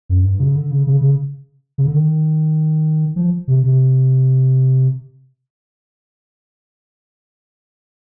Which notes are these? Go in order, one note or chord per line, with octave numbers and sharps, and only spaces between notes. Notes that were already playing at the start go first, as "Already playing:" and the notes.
F#2
G2
C#3
D3
C#3
C#3
C#3
C#3
D3
D#3
F3
C3
C3